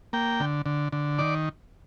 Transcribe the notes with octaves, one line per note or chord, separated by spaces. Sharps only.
A#3 G5
D3
D3
D3
D#3 D5